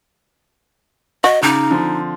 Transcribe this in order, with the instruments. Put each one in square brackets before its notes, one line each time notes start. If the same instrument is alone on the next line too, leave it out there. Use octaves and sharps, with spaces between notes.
[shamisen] F#4 [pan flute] D#5
[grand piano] C#3 D6 [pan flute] D#4
[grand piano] D3 F3 C4